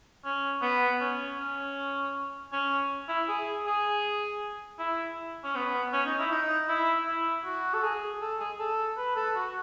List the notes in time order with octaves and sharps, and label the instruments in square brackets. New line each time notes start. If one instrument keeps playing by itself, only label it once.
[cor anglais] C#4
B3
C#4
C#4
C#4
E4
G#4
G#4
E4
C#4
B3
C#4
D#4
E4
D#4
E4
E4
F#4
A4
G#4
A4
G#4
A4
B4
A4
F#4